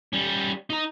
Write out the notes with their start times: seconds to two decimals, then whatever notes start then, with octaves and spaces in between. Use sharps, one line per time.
0.13 G3 C#4
0.70 D#4 A#5